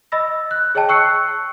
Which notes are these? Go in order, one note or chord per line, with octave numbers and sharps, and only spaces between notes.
D#5 B5 E6 A#6
F#6
G#4 C#5 D#5 G5 A5
C#6 E6 F#6 C7 C#7